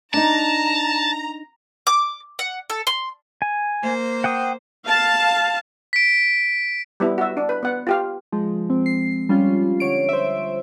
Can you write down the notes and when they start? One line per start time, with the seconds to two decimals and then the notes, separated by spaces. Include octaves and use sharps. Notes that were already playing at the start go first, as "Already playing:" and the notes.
0.14 D4 D#4 A5 A#5
1.87 D6
2.39 F#5
2.70 A4
2.87 C6
3.42 G#5
3.82 A#3 C5
4.24 F#5 G5 D#6
4.85 F5 A5
5.93 B6 D7
7.00 G3 B3 E4
7.18 F#4 E5
7.37 D4
7.49 B4
7.63 B3 F#5
7.87 F4 G4 F5
8.32 F3 G#3
8.70 C4
8.86 C7
9.29 G3 C#4 F4
9.80 D3 C#5 D7
10.09 C5 E5